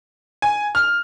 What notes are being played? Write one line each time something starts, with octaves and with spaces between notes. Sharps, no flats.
G#5
F6